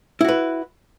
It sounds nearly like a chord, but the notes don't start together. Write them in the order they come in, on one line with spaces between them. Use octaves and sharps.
E4 F#4 B4